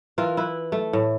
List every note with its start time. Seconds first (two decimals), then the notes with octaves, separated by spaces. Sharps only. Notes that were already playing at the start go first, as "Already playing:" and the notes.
0.18 E3 F4 A#4
0.37 E4 B4
0.72 A3
0.93 A2